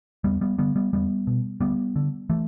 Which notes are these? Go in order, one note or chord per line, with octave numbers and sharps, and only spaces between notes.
E2 G3 B3
G3 B3
D3 G3 B3
G3 B3
E2 G3 B3
B2
D2 G3 B3
D3
E3 A3